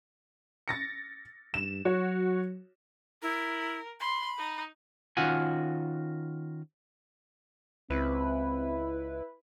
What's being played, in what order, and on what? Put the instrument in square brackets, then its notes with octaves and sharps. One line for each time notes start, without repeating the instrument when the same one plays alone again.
[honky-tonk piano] A6 A#6 C#7
[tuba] G2 [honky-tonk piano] E7
[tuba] F#3 [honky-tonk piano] F#4 C#5
[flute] E4 [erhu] A#4
[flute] B5 [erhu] C6
[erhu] D#4
[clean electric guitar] D#3 C#4 F4 F#4 F#5 G#5
[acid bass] C#2 [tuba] C4 [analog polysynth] E4 B4